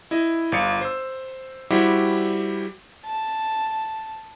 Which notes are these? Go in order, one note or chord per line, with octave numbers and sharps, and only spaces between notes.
E4 D#5
G1 F5 C#7
C5 E6
G3 E4 F#4 G4 C5
A5